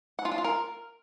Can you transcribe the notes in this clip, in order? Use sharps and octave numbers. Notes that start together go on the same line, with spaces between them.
F#5
F4
D4
F4
A#4